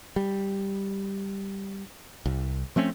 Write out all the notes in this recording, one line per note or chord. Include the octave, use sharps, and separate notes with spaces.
G3
C2
F3 A3 C4 C#4